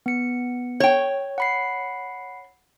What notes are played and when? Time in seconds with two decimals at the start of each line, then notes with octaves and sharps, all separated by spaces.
0.06 B3 C#7
0.80 C#5 G5
1.38 F#5 B5 C7